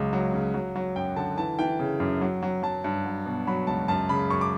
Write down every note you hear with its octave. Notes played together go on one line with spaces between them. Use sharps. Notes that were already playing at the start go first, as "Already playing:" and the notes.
Already playing: C#2 C#3 F#3
F#3
C#3
F#3
F#3
F#2 G5
D3 A5
E3 A5
E3 G5
C#3
F#2
F#3
F#3
F#3 A5
G2
F#3
B2
F#3 B5
C#2 A5
F#2 A5
C#3 B5
F#2 C#6
D6